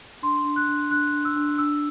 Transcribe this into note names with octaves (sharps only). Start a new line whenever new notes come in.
D4 C6
D4
F#6
D4
D4 F#6
D4
E6
D4
D4 E6